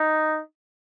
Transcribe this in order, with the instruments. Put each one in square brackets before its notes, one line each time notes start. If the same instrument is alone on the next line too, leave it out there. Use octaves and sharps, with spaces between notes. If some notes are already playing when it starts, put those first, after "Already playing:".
Already playing: [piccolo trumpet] D#4